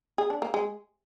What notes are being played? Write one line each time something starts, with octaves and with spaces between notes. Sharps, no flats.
G#4
D4
A#3
G#3